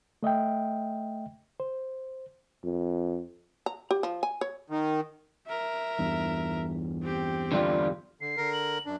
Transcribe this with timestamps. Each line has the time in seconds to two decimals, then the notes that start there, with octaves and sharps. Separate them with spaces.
0.23 A3 D#5 E5 G5
1.60 C5
2.64 F2
3.66 A#5
3.91 G4
4.03 F3
4.23 G#5
4.41 C#5
4.70 D#3
5.47 A#4 E5
5.99 E2 G2 E3
7.02 C4 G4
7.52 D3 G3 F4
8.21 D3 C7
8.37 D3 A#4
8.53 F#7
8.86 F#2 D4